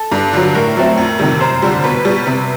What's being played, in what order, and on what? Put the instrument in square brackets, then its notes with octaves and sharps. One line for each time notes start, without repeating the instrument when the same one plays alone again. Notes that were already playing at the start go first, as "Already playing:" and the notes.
Already playing: [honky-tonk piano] A4
G2
D3 F#3
A2 A#4
F#3 A3 C4
F2
C3 D#3 G3
F#2 C5
D3 G3
B2 B4
G3 B3
C3